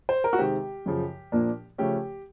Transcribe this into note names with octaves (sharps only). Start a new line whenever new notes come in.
C5
A#4
F#4
C3 D#3 G#3 C4 G4
F#2 C#3 F3
A#2 F3 A#3 D4
C#3 F3 A3 C#4 G4